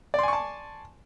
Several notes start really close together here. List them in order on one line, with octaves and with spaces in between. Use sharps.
D5 C6 G#5 C#6 A5